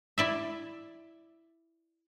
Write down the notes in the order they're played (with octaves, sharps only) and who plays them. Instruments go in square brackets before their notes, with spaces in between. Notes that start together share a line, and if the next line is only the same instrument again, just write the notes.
[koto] E4 D5 E5